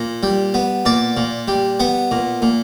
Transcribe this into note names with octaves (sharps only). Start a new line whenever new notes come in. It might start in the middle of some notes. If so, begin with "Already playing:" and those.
Already playing: A#2
G3
B3
A#2 D5
A#2
G3
B3 F#5
A#2
A#2